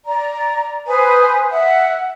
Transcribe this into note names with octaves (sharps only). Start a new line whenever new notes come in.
D5 A#5
B4 C5 G#5 D#6
E5 F#5